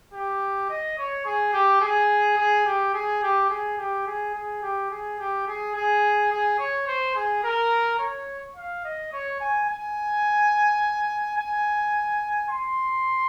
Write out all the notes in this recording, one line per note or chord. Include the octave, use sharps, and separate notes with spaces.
G4
D#5
C#5
G#4
G4
G#4
G#4
G4
G#4
G4
G#4
G4
G#4
G#4
G4
G#4
G4
G#4
G#4
G#4
C#5
C5
G#4
A#4
C#5
F5
D#5
C#5
G#5
G#5
G#5
C6